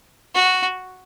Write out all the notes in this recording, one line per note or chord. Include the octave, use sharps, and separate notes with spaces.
F#4